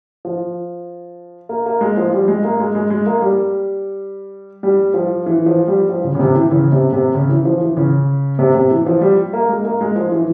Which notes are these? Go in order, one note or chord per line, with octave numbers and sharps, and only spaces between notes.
F3
A#3
A#3
G#3
F3
G3
G#3
A#3
G#3
G#3
G#3
A#3
G3
G3
F3
E3
F3
G3
F3
C#3
C#3
C3
E3
C#3
C3
C3
C#3
E3
F3
E3
C#3
C3
C3
E3
F3
G3
A#3
G#3
A#3
G#3
F3
E3